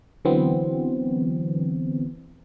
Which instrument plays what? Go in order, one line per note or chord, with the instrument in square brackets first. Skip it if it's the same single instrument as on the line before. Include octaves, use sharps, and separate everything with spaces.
[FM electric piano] D3 E3 F#3 B3 C4